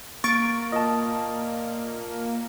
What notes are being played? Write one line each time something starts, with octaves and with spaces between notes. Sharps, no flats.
A#3 C#6 A6 D7
A#2 D#5 A5